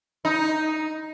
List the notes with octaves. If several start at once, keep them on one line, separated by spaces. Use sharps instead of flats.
D#4